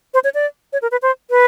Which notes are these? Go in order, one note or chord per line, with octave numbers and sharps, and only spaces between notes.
C5
C#5
D5
C#5
A#4
B4
C5
B4